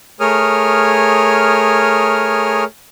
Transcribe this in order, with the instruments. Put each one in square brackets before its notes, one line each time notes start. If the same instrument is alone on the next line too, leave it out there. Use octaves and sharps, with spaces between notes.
[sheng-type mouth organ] A3 G#4 A#4 C#5 D#6 F6